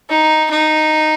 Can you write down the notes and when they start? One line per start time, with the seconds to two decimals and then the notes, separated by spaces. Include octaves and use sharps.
0.10 D#4
0.51 D#4